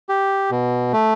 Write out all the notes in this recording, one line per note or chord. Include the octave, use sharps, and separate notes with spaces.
G4
B2
A3